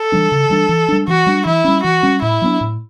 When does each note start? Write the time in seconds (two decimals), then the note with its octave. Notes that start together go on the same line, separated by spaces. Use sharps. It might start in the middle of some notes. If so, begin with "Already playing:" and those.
Already playing: A4
0.12 E3 G3 D4
0.32 C#3
0.50 E3 G3 D4
0.69 E3
0.88 G3 D4
1.08 E3 F#4
1.26 G3 D4
1.45 E3 E4
1.64 G3 C#4
1.84 E3 F#4
2.03 G3 C#4
2.22 A2 E4
2.42 F#3 B3 D4
2.61 A2